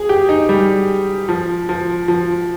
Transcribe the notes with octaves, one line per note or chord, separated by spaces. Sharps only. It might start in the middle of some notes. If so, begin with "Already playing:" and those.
Already playing: G#4
G4
D#4
G3
F3
F3
F3